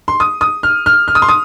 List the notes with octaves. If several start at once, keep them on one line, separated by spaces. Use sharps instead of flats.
C6
D#6
D#6
F6
F6
F6
D#6
C6
D#6